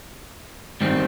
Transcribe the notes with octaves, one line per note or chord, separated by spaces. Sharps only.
G#2 D#3 G3 C4